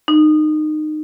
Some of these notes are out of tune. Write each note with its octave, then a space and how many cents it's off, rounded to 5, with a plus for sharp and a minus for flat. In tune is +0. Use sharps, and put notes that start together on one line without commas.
D#4 -25